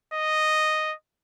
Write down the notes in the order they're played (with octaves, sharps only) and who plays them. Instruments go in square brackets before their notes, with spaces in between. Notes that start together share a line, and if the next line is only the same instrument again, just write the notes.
[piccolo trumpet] D#5